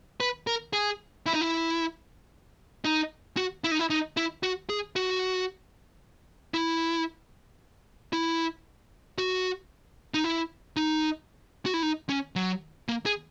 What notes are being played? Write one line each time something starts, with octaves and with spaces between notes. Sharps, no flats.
B4
A#4
G#4
E4
D#4
E4
D#4
F#4
E4
D#4
E4
D#4
E4
F#4
G#4
F#4
E4
E4
F#4
D#4
E4
D#4
F#4
E4
D#4
C#4
F#3
A#3
G#4